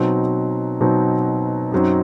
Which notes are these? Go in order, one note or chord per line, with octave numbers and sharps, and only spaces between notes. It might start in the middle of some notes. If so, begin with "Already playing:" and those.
Already playing: B2 F#3 C4 D#4
B2 F#3 C4 D#4
F#2 F#3 C4 D#4